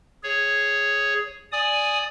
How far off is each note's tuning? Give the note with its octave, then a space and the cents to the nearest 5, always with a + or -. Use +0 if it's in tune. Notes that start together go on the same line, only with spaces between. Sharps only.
G#4 +5 C#5 +0
D5 +0 G#5 +0 D#6 -5